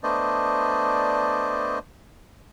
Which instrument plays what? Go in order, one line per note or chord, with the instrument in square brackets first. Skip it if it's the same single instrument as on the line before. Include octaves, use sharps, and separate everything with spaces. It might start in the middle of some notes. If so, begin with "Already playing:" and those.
[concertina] A3 B3 D4 C5 D5 D#5